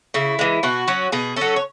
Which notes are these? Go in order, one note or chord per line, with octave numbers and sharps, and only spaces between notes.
C#3 E4
E3 G#3
B2 F#4
F#3 C#4
B2 G#4
F#3 C#4 A4
C#5